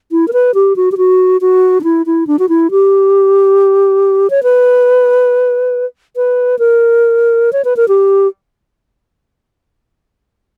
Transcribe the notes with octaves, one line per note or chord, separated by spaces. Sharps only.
E4
A#4
B4
G4
F#4
G4
F#4
F#4
D4
E4
E4
D4
F#4
E4
G4
C#5
B4
B4
A#4
C#5
B4
A#4
G4